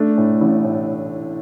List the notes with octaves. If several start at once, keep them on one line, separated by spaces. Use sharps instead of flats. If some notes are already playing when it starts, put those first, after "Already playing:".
Already playing: A3 D4
A2
A1
A2